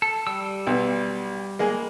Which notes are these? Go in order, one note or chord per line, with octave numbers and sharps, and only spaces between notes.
A4
G3 E6
B1
G#3 A#3 G#4